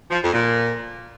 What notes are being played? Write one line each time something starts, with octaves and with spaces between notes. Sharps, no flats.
F3
F2
A#2